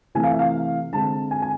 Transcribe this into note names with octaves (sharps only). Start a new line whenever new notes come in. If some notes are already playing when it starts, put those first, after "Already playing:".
C3 E3 A3 G#5
F5
E5
F5
D3 G#3 C4 A5
G#5
G#5